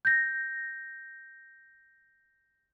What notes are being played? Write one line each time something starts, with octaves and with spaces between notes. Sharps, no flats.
G6 A#6